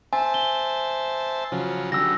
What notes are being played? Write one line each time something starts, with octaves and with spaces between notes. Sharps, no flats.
C5 E5 G#5 A5
G7
C#3 F3 F#3
D3 F#3 G3 E6 A#6